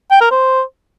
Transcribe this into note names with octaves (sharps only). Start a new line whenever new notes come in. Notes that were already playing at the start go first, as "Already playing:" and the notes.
G5
A#4
C5